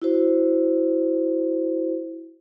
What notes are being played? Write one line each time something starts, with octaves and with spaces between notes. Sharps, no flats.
E4 F#4 C5